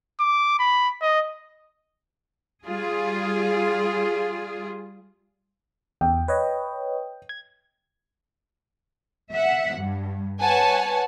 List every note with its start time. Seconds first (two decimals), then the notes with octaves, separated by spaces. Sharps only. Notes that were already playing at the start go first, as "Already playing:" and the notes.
0.20 D6
0.59 B5
1.02 D#5
2.66 G3 F4 G#4
6.01 E2 G5
6.28 B4 C#5 D#5
7.29 G#6
9.33 E5 F#5
9.79 G2
10.40 B4 C#5 F#5 G#5 A5